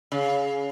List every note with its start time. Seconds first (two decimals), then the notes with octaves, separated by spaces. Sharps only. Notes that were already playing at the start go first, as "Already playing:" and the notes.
0.12 C#3